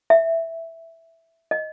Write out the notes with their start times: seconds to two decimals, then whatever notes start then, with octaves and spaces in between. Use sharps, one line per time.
0.10 E5
1.51 D#5